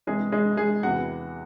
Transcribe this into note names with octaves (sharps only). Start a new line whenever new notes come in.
C2 C3 E3 G#3 G#4
G#3 G#4
G#3 G#4
E2 C3 E3 F#4 F#5